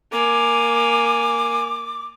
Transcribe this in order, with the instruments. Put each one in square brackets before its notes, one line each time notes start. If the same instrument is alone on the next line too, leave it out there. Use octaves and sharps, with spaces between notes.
[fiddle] A#3 G#5 [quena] D6